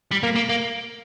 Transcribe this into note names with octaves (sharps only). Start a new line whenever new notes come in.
G3
A#3
A#3
A#3